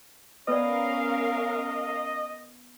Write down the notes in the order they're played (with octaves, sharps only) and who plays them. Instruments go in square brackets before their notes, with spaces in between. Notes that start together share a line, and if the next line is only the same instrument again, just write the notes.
[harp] B3 [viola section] C#4 A#4 F5 [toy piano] B4 D5 [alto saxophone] D#5